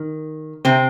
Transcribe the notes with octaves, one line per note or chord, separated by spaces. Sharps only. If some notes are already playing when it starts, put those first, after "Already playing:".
Already playing: D#3
C3 C4